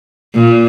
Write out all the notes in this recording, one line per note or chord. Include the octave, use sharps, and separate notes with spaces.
A#2